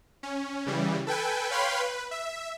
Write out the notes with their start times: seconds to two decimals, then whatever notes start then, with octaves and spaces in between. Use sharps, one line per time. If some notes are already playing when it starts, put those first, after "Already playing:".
0.23 C#4
0.66 C#3 E3 G3
1.07 A4 B4 G5 G#5
1.50 B4 C#5 F5 G5 B5 C6
1.80 B4
2.11 E5